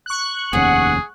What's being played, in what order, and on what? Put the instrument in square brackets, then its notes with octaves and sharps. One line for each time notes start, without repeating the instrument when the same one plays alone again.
[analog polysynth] C#6 F#6
[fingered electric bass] F1 D#2 C#4 [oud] B3 [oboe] G#4